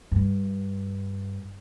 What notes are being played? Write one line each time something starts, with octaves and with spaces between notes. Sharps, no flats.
G2